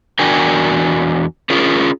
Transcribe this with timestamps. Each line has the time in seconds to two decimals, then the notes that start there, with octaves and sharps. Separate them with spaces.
0.19 E2 D4 F#4 A#4 G5 G#5
1.50 C#4 F4 G#4 A#4